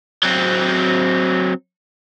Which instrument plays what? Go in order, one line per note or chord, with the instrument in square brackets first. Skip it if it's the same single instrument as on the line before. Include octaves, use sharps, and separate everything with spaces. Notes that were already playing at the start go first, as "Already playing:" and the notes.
[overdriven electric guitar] F#3 C4